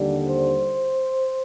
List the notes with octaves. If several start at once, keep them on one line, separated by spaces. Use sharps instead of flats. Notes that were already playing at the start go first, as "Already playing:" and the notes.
Already playing: D#2 D3 G3
C5